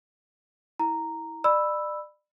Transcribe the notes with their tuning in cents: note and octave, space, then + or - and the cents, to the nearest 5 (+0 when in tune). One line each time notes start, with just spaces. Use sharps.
E4 -20 A#5 -5
D5 +30 B5 +0 E6 +0